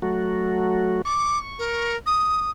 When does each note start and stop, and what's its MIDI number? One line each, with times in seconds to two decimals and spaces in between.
0.02 1.02 54
0.02 1.02 57
0.02 1.02 66
1.05 1.95 85
1.05 1.39 86
1.59 1.96 70
2.06 2.50 87